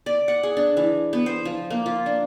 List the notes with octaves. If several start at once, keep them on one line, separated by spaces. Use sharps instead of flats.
D5
F#5
G#4
D4
E3
B3
C5
F3
A#3
F4
D4